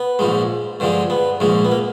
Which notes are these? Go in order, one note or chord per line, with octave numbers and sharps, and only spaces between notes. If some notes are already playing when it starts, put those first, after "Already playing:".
Already playing: B3
A#1 G#2 F3 G#3
G2 D3 F3 G#3
B3
A#1 G#2 F3 G#3
B3
A#3